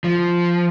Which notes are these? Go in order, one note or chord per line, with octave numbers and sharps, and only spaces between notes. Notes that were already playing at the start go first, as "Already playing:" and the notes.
F3